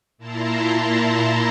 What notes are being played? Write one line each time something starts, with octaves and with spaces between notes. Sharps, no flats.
A#2 E4 A5 A#5 C6